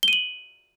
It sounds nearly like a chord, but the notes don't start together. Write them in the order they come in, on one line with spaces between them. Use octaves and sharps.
G7 D#7 F#7